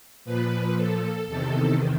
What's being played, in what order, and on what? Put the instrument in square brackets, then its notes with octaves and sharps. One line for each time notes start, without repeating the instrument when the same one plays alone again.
[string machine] A#2 F3 B4
A4
E2 C3 D#3 A4